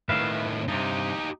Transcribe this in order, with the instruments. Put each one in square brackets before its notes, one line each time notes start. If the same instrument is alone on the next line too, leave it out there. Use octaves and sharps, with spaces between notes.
[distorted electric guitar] A2 D#3 [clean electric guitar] B4 E5 F5
[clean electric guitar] G2 C3 [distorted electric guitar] D#4 G4